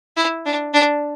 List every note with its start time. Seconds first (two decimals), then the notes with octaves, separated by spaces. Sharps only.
0.17 E4
0.46 D4
0.74 D4